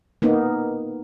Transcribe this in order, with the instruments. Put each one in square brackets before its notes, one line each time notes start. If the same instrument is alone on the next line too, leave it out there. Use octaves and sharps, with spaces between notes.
[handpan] A#3 B3 D#4